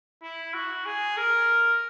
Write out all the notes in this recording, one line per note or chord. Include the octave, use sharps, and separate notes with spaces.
E4
F#4
G#4
A#4